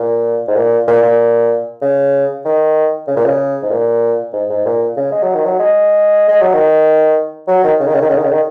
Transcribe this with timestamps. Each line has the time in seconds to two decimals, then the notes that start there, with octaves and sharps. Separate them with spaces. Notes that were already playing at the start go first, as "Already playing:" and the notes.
Already playing: A#2
0.48 G#2
0.56 A#2
0.87 A#2
1.02 A#2
1.81 C#3
2.45 D#3
3.07 C#3
3.16 A#2
3.25 C#3
3.62 G#2
3.70 A#2
4.33 G#2
4.49 G#2
4.65 A#2
4.97 C#3
5.12 G#3
5.22 F#3
5.34 D#3
5.45 F#3
5.59 G#3
6.28 G#3
6.41 F#3
6.53 D#3
7.48 F#3
7.64 D#3
7.80 C#3
7.87 D#3
7.94 C#3
8.02 D#3
8.09 C#3
8.17 D#3
8.23 C#3
8.32 D#3